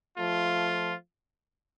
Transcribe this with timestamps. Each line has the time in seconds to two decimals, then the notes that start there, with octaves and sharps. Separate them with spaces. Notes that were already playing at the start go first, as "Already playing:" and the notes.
0.18 F3 A3 F4